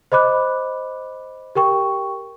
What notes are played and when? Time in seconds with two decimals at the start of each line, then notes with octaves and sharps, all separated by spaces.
0.12 C5 D#5 B5 D6 F#6
1.55 G4 A#4 G5 C#6